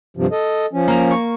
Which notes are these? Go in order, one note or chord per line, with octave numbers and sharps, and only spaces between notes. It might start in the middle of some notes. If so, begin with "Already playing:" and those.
G2 C3 F3
A4 D#5
F3 C#4
A#3 A#4
C#6